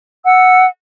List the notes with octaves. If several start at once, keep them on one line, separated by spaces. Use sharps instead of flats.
F#5 E6